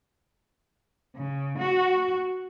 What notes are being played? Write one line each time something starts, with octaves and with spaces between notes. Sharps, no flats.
C#3
F#4